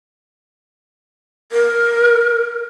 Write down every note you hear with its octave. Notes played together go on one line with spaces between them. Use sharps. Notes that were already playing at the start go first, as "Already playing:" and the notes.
A#4